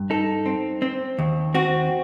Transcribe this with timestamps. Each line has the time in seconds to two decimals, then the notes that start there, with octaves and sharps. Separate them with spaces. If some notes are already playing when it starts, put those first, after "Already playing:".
Already playing: G2
0.10 D#4 A4
0.46 C4
0.82 C4
1.19 D#2
1.54 C4 F#4